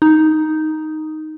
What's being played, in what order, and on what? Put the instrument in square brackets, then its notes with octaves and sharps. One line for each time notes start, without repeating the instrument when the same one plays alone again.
[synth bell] D#4